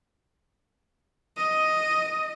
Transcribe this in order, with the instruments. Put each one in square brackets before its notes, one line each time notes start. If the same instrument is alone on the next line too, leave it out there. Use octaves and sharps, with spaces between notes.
[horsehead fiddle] D#5